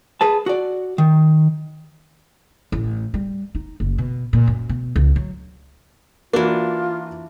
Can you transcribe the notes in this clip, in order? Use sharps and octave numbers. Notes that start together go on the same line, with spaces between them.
G#4 B4 A5
F#4 D5
D#3
A1
G3
D#4
F#1
B2
A#2
F#2
B2
C#2
F#3
E3 A#3 D4 F4 F#4